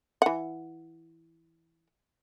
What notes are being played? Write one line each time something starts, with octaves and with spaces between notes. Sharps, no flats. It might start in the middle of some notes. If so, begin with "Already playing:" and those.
E3 F#5